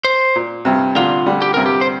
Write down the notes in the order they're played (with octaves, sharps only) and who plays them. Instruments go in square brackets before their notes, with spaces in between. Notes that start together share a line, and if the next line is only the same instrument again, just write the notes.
[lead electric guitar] C5
[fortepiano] A#2
G2 C3
[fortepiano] A#2 D3 [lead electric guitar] F4
[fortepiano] D3 G3
[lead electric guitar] G4
[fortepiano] G2 C3 [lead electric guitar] A#4
[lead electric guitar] G4
C5